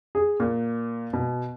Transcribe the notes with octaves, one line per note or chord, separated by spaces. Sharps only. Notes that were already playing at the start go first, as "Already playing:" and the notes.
G#4
A#2
B2